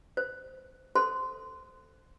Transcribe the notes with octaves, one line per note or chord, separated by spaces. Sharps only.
C5
A4 C5 C6